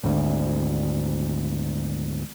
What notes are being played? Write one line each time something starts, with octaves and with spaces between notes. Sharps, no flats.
G#1 D2